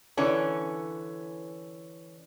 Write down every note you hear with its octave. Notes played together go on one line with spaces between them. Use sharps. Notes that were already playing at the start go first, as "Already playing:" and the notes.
D3 E3 C#4